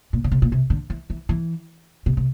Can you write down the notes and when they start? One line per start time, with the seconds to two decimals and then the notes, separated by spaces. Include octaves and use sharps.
0.13 A#2
0.24 D3
0.32 C3
0.42 A#2
0.52 C3
0.70 D3
0.90 E3
1.10 E3
1.29 E3
2.06 C3
2.17 C3